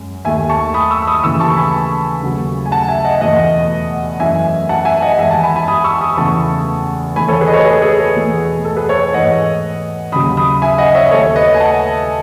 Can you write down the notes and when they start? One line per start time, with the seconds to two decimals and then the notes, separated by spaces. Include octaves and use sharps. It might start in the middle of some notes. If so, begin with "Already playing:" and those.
Already playing: F#2 G#3
0.25 D#2 D#3 A3 E5 G#5
0.49 A5 C#6
0.74 B5 D#6
0.91 C#6 E6
1.02 E6
1.07 B5 D#6
1.23 D#2 C#3 E3 A3 C#6 E6
1.40 A5 C#6
1.56 G#5 B5
2.23 D#2 C#3 F#3 A3
2.66 G#5
2.72 F#5 A5
2.88 E5 G#5
3.05 D#5 F#5
3.21 E2 B2 A3 D#5 F#5
4.20 F#2 E3 A3 E5 G#5
4.69 F#5 A5
4.85 E5 G#5
5.02 D#5 F#5
5.19 E2 D#3 G#3 E5 G#5
5.31 F#5 A5
5.43 G#5 B5
5.56 G#5 B5
5.68 B5 D#6
5.84 C#6 E6
6.01 B5 D#6
6.17 E2 C#3 E3 A3 A5 C#6
7.16 E2 D#3 A3 G#5 B5
7.28 A4 C#5
7.41 G#4 B4
7.48 D#5
7.53 A4 C#5
7.66 G#4 B4
7.82 G#4
7.98 G#4
8.15 E2 B2 A3
8.65 A4
8.77 G#4 B4
8.89 A4 C#5
9.14 G#2 E3 A3 D#5 F#5
10.12 D#2 C#3 F#3 B5 D#6
10.37 B5 D#6
10.62 E5 G#5
10.78 D#5 F#5
10.95 C#5 E5
11.11 D#2 D#3 A3 A4 C#5
11.36 B4 D#5
11.55 G#5
11.60 F#5 A5